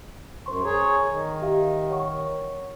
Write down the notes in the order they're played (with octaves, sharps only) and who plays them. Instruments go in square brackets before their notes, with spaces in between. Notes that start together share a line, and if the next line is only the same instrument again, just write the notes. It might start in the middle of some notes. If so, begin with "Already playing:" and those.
[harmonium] F#2 [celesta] C5 C6 C#6
[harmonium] G#4 C#5 [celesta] A#5
[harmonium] D#3
[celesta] G4 E5 F5
C#5 F#5 C#6